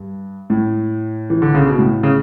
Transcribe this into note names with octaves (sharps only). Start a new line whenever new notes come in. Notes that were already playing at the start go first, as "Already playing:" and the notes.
Already playing: G2
A2
E3
D3
C#3
B2
A2
C#3